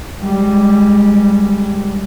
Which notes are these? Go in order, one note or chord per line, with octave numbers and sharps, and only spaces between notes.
G3 G#3